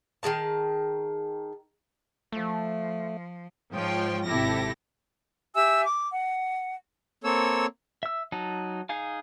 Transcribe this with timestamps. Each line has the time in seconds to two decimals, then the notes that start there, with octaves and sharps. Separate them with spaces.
0.23 D#3 A#3 G#4 A5
2.33 F3 A3
3.73 G#2 F3 C#5 G5 C6
4.26 G#1 C3 E4 G4 A4 A#6
5.55 G4 E5 G#5 E6
5.85 D6
6.12 F#5
7.24 A#3 C4 A4 C#5 E6
8.03 E5 E6
8.32 F#3 D#4 A5
8.89 D#4 G#4 F5 G#5